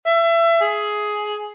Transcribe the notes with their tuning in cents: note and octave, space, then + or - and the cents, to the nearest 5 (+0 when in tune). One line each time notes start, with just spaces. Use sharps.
E5 +30
G#4 +10